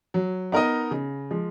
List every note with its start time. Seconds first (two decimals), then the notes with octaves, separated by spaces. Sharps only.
0.14 F#3
0.52 B3 D#4 A#4 D#5
0.91 C#3
1.31 F3 G#3